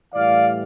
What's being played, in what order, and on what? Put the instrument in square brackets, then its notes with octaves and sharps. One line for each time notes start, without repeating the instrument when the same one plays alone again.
[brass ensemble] A2 E3 G3 D5 F5